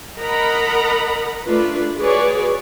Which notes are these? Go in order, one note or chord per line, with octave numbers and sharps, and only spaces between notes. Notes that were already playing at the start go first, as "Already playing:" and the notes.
A#4 D#5 F#5 A#5 B5
A3 D4 F4 B4
F#4 G#4 B4 C#5 D5